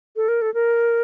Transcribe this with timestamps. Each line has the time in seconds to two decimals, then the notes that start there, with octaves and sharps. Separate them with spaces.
0.16 A4
0.28 A#4
0.41 A4
0.54 A#4